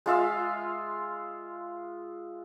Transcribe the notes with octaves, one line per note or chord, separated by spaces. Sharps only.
G#3 F4 E5 F5